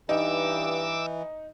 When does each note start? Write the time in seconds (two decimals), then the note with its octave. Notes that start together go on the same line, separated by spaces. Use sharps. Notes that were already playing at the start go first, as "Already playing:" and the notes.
0.09 G2 E3 D#4 D6 E6